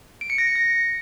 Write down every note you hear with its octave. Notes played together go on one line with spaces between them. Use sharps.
D7
C#7
A#6
C#7
A#6